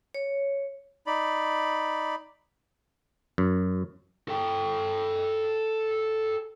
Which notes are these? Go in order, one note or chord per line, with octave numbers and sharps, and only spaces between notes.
C#5
D#4 D5 B5
F#2
A4 G5